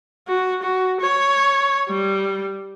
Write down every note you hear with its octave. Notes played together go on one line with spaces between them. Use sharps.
F#4
F#4
C#5
G3